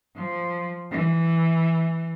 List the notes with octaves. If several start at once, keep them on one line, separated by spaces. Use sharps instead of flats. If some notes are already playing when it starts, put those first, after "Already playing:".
F3
E3